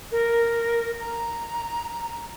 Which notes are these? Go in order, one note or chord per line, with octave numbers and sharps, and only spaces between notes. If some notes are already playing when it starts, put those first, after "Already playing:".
A#4
A#5